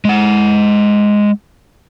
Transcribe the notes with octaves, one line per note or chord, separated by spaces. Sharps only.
G#3 F#5